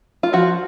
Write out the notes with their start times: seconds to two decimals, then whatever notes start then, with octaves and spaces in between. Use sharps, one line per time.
0.23 F4
0.33 F3 F#4